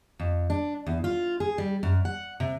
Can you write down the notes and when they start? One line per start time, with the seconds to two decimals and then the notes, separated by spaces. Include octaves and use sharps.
0.19 F2
0.50 D4
0.87 E2
1.04 F4
1.40 G#4
1.58 G3
1.83 F#2
2.05 F#5
2.40 C3